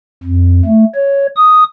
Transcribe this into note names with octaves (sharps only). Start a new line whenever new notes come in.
F2
A3
C#5
D#6